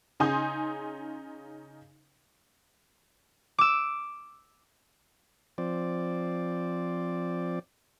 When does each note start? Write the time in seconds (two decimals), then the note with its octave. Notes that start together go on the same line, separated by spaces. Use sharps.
0.20 C#3 D#4 G#5 C6 D#6 G6
3.59 D6 E6
5.58 F3 C4 D5